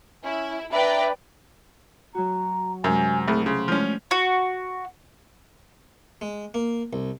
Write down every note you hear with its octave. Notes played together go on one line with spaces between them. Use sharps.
C#4 E4
D4 B4 D5 E5 G5 A#5 B5
F#3 F#4 A#5
F#2 C3 F#3 G#3 G#5
C2 A3 G#4
C#3 C6
F3 G#3 C#4 D4
F#4
G#3
A#3
C2